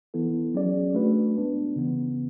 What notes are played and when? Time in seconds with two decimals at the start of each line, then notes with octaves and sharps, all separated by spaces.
0.14 E3 B3 E4 A4
0.54 F#3 C#4 G#4 D5
0.95 A3 D4 F#4 B4
1.36 G#3 B3 D4
1.76 C#3 E3 B3